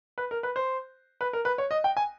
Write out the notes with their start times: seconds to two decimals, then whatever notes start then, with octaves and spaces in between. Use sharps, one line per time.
0.18 B4
0.31 A#4
0.43 B4
0.56 C5
1.21 B4
1.33 A#4
1.45 B4
1.58 C#5
1.71 D#5
1.84 G5
1.97 G#5